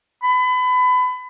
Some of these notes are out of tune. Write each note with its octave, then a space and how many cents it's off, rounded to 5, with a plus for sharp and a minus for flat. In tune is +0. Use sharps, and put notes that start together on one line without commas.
B5 +30